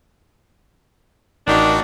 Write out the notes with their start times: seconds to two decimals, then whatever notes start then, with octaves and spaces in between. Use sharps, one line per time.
1.47 A1 D#3 D4 D#4 F#4